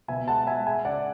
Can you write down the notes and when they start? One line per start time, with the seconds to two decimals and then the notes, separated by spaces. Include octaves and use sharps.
0.08 B2 E5 G#5
0.28 G#3 F#5 A5
0.46 G#3 E5 G#5
0.66 G#3 E5 G#5
0.85 C#3 D5 F#5